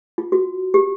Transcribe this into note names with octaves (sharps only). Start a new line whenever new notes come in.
F4
F#4
G4